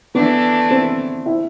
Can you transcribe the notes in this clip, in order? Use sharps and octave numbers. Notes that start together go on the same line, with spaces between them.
E3 A3 B3 D4
C4
E4